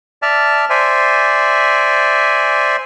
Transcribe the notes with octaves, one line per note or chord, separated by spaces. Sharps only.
D5 E5 A5 F6
C5 D5 E5 G#5